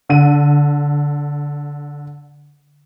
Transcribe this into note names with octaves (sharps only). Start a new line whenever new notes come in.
D3 D#7